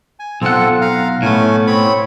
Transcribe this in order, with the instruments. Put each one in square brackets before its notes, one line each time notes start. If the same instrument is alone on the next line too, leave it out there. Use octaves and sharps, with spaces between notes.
[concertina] G#5
[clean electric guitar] B1 F#5 [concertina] C4 F4 A4
[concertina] F5 A#5
[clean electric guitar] A2 B3 [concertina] A3 C#4 G#5
[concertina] C4 C#5 B5